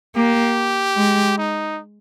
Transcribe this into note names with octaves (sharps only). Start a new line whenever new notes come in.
A#3 G4
G#3
D#4